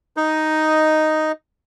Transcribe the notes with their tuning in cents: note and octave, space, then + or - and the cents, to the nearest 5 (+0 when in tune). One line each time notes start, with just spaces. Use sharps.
D#4 +0 D#5 +0